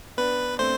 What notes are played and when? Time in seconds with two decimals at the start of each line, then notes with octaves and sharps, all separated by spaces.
0.17 B3 D4 B4
0.55 D4
0.59 A3 C4 C5